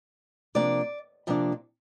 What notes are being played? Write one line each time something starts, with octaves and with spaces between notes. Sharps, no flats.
C3 F3 A#3 D4 D5
C3 F3 A#3 D4